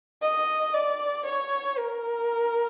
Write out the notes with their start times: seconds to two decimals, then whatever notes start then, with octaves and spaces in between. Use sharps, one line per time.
0.22 D#5
0.74 D5
1.25 C#5
1.78 A#4